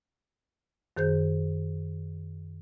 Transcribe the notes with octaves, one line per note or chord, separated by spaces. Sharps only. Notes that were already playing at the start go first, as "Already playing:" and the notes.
F#2 D#3 G#4 C5 G6